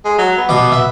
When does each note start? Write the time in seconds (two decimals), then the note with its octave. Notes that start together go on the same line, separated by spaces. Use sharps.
0.05 G#3
0.18 F#3
0.37 B3
0.49 B2 D6
0.72 E5